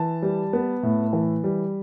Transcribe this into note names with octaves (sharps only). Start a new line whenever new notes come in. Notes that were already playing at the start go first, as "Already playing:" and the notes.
Already playing: E3 A5
G3
B3
A2
E3
G3